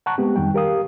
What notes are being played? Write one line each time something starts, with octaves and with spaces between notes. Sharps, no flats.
F#5 A5 A#5 C#6 F#6
G#3 B3 C4 G4
F2 D#3 G3 G5
G4 A#4 F5 D#6